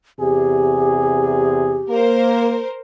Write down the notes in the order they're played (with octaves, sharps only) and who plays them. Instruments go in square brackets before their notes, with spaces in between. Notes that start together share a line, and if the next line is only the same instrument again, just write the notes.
[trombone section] E2 C3 G#4 [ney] G4
[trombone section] A#3 [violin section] A#4 C5